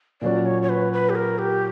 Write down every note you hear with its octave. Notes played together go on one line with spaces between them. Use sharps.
A#2 F#3 C#4 F#4 D5
C#5
C#5
B4
B4
G4
A#4
G4